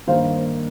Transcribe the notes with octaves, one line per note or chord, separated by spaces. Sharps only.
G2 D#3 A#3 D#4 C5 F5